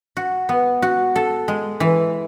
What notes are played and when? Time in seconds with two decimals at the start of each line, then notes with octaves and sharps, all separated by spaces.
0.17 F#4
0.49 B3
0.82 F#4
1.16 A4
1.48 G#3
1.80 E3